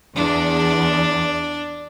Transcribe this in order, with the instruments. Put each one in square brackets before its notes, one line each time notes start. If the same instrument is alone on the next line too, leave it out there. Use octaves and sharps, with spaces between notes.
[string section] E2 [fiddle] D4